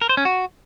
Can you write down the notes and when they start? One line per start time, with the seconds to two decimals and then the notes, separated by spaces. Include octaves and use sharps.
0.01 A#4
0.09 C5
0.17 C#4
0.25 F#4